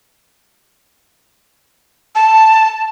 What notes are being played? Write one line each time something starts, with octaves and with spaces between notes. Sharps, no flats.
A5